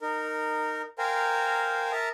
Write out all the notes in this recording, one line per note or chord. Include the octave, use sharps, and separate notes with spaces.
D#4 A#4
A#4 C5 F5 G5 G#5 A#5
A#4 E5 A5 A#5 D#6